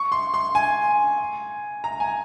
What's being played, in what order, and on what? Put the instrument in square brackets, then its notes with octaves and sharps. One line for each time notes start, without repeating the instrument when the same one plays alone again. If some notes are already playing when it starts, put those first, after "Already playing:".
Already playing: [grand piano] C#6
C6
C6
G#5
A#5
G#5